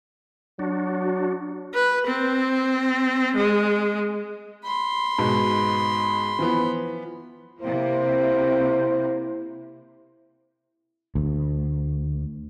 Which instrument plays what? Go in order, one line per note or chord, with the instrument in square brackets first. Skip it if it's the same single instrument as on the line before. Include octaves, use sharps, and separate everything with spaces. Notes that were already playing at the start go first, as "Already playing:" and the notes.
[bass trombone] F#3 [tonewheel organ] D4 F#4
[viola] B4
C4
G#3
[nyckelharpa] B5 C6
[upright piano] G#2 B2
E3 F3 B3
[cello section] C3 A#3 [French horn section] E4 [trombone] C5
[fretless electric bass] D2